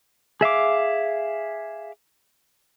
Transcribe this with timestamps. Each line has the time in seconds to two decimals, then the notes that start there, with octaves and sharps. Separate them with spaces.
0.41 G#4 E5 F5 D6